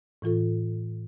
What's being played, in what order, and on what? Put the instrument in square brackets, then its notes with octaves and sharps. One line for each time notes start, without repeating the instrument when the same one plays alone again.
[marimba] A2 E3 F4 A4